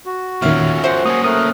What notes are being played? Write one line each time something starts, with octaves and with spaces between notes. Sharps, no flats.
F#4
E2 A#2 D#3 F3 C#4 E5 F6
C5 E5 F#5
A#3 C#4 G#5 D#6
A3 A#4 D#6 F6 F#6